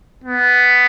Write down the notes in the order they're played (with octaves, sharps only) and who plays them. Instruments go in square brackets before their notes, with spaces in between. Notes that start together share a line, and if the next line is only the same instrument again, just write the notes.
[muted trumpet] B3